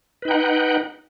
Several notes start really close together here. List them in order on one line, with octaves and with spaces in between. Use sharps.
B4 D#4 G5 F#5